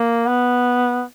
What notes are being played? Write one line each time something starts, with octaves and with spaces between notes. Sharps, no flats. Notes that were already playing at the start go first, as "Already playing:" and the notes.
Already playing: A#3
B3